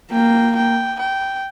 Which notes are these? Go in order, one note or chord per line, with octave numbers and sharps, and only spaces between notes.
A#3 G5
G5
G5